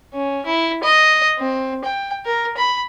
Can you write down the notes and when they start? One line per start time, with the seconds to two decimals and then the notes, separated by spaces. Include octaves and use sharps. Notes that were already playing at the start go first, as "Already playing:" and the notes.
0.14 C#4
0.46 E4
0.83 D#5
1.39 C4
1.85 G5
2.26 A#4
2.57 B5